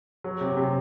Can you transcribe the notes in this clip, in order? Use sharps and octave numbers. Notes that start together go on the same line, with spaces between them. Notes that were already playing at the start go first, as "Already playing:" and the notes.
F#3
C3
C3